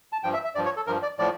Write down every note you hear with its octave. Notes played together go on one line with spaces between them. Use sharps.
A5
G2 F3 G5
E5
E5
G2 F3 D5
C#5
A4
G2 F3 A#4
D5
A2 F3 D5